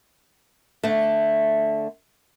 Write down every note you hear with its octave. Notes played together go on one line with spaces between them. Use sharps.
D3 A3